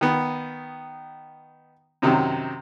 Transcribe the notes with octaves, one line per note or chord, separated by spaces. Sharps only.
D#3 B3
F#2 C3 D#3 F#3